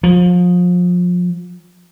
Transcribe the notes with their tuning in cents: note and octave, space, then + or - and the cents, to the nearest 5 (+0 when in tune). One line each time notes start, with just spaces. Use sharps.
F3 +30